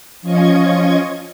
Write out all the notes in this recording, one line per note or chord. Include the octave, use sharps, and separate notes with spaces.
F3 C#4 F4 D#5 C#6 G#6